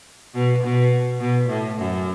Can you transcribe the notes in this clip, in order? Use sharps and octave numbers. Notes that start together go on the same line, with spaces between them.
B2
B2
B2
A2
F#2